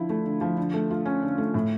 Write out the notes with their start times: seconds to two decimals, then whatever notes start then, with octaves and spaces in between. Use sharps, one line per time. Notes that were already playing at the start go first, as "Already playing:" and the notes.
Already playing: D3 F3 E4
0.09 A3
0.26 D3
0.41 F3
0.57 D3
0.74 A3
0.91 F4
1.05 C#4
1.23 D3
1.38 A3
1.54 A2